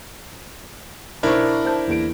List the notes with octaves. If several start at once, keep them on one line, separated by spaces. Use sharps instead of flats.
B1 D4 E4 A#4 C5 C#6
C5 A5 G6
E2 A#3 D7